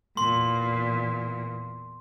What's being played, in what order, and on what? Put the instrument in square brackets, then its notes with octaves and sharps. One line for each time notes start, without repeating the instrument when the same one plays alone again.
[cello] E2 A#2 [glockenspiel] C6